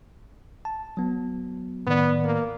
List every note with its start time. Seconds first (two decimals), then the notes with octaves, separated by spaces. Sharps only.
0.65 A5
0.97 F#3 B3
1.87 A2 D#3 B3 D5
2.24 A#3